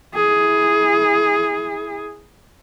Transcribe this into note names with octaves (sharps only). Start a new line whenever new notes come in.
E4 G#4